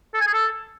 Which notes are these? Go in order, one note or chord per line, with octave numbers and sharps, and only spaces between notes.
A4
G#5
G#4
A4